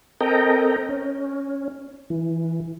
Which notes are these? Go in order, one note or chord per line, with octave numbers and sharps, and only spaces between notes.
C4 A4 A#4 D#5 G5 A#5
C#4
E3